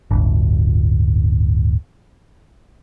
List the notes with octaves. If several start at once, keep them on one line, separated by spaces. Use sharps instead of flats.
D1 G1